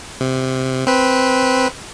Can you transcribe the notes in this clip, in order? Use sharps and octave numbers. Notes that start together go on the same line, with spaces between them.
C3
C4 B4